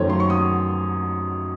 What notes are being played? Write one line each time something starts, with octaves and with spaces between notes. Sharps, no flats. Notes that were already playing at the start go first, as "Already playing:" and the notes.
Already playing: F#2 D#3 A3 C5 C#5
C6
C#6
D#6